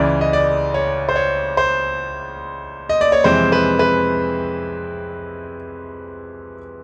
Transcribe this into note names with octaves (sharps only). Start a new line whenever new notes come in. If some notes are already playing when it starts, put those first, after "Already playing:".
Already playing: C#2 C#3 E3 D5
D#5
D5
C#5
C5
C#5
C5
D#5
D5
C#5
F2 C3 E3 G#3 C4 C5
B4
B4